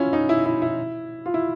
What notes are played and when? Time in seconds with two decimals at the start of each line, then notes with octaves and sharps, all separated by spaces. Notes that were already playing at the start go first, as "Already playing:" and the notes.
Already playing: C#4 E4 F4
0.13 D#4
0.29 E4
0.46 E4
0.62 E4
1.26 F4
1.34 E4